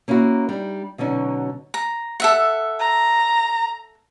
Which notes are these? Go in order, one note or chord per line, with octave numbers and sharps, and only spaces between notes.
A#3 C#4 D#4 E4 F#4
G3 D4 D#4
B2 D3 F#3 C#4 D#4
A#5
A4 E5 F#5
A#5